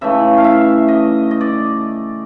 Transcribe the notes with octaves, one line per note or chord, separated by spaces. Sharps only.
C#3 E3 A3 E5
F5
E5
D#5
D#5
D5